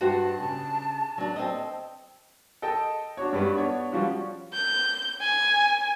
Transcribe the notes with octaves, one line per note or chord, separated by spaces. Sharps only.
G2 F#4 C5 F#5 A5
C#3
F#3 D4
C4 A4 D#5
A4 D#5 G5 A5
D4 F#4 C#5
G2 G3 B4
B3 D4 C#5
F3 G3 C#4 F4 F#4
G6
G#5